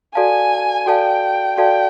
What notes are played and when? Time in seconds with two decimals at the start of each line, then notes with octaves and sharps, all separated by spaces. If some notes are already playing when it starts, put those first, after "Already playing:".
0.15 F#4 A4 D5 F5 G#5 A5
0.86 F#4 A4 D5 F5 G5 A5
1.58 F#4 A4 D5 F5 G5 A5